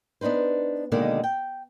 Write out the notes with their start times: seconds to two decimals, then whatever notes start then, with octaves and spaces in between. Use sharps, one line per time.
0.21 B3 D4 D#4 B4 C5
0.92 B2 D3 D#3 G#3 A#3
1.24 G5